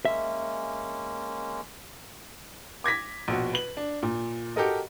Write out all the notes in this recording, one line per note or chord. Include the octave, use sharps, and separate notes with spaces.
G#3 A#3 C#4 E5
D6 G#6 A#6 B6
A#1 B2 F#4
B4 F#7
D4
A#2
F#4 G4 A4 A#4 D#5